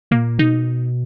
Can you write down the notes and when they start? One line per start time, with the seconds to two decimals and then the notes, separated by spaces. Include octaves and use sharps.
0.11 A#2 A#3
0.39 B2 D#4